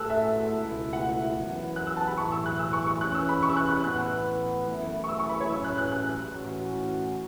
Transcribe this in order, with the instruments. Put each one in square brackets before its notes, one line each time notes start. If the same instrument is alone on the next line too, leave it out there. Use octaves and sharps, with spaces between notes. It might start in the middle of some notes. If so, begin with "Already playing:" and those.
Already playing: [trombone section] A2 A3 F#4 A4 [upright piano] E6 F#6
[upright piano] E5
[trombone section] C#2 B2 A3 E4
[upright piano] F#5
[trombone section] F#2 E3 B3
[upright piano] F#6
E6
A5
B5
[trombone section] B1 A2 E3 [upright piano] C#6
[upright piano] E6
F#6
E6
C#6
C#6
[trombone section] E2 E3 C#4 [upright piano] F#6
[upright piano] E6
B5
C#6
E6
F#6
F#6
[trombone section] A2 E3 B3 [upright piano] F#6
[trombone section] F#2 E3 A3 E4
[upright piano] C#6
E6
C#6
B5
C#5
[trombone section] A1 A2 F#3 C#4 [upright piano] E6
[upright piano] F#6
F#6
F#6
[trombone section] A2 E3 C#4 F#4